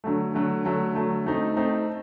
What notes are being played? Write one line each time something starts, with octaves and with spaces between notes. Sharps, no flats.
D3 F#3 A3
D3 F#3 A3
D3 F#3 A3
D3 F#3 A3
A3 C4 D#4
A3 C4 D#4